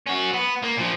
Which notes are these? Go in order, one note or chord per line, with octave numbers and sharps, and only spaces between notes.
C#4 F#4
B3
A#3
A#2 F3